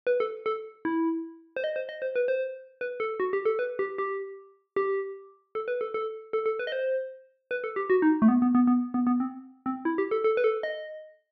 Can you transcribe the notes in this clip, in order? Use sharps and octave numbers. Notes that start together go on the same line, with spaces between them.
B4
A4
A4
E4
C5
D#5
C5
D#5
C5
B4
C5
B4
A4
F#4
G4
A4
B4
G4
G4
G4
A4
B4
A4
A4
A4
A4
B4
D#5
C5
B4
A4
G4
F#4
D#4
A3
B3
B3
B3
B3
B3
B3
C4
C4
E4
G4
A4
A4
B4
A4
D#5